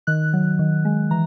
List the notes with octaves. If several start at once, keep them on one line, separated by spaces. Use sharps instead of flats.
D#3 F#6
F#3
D#3
G#3
E3 A#5